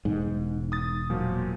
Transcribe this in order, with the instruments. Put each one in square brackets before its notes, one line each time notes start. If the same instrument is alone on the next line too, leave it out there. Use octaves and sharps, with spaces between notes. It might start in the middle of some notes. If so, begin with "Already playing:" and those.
[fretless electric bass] E1 G#2
[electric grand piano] D#6 A6
A#2 F3 F#3